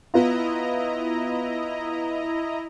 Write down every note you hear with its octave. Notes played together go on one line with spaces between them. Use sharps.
B3 E4 F4 D#5 A#5